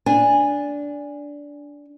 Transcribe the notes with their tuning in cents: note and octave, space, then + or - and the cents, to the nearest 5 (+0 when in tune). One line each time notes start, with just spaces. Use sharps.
D4 -15 G#5 -15